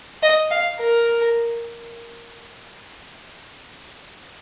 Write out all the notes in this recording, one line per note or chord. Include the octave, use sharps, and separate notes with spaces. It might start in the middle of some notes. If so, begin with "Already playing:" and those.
D#5
F5
A#4